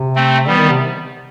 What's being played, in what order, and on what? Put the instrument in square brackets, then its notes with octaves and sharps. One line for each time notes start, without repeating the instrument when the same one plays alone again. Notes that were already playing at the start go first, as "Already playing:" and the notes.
Already playing: [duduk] C3
[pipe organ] A3 C4
[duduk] E3 [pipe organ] G3 B3
[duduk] D#3
C3